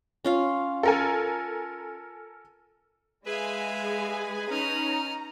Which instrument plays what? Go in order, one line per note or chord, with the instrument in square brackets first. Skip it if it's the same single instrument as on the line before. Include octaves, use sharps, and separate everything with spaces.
[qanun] C#4 F4 F5
[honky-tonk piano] A4 A#4 G#5
[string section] G#3 [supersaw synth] G#4 G#5 [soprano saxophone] B4 [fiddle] E5 F5
[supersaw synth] C#4 D#4 [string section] A#5 [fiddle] D#6 F6